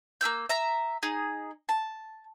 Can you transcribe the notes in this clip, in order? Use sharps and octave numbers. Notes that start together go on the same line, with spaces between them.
A#3 G4 E6 G6
E5 A#5
D#4 G#4
A5